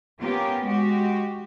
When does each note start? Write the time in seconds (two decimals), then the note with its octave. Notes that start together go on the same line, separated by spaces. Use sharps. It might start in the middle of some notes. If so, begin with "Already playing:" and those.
0.21 A#3 B3 C#4 F4 G4
0.66 G#3 F#4 G4